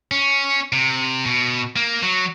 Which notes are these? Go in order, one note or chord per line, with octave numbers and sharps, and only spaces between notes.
C#4
C3
B2
A#3
F#3